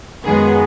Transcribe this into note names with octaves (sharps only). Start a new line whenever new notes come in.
F#2 D#3 G#3 B3 G#4